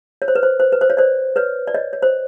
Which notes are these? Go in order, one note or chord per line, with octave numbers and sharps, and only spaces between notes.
C#5
C5
B4
C5
C5
B4
C5
C#5
C5 D5
B4 C#5
D5
C#5 D#5
C#5
C5